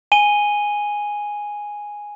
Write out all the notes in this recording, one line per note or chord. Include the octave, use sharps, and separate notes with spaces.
G#5 D#7 G7